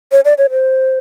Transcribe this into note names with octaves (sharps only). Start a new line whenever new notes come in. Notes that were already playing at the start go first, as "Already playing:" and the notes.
C#5
D5
C#5
C5